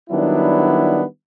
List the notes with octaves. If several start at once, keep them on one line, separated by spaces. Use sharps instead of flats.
D#3 F#3 G3 B3 D4 E4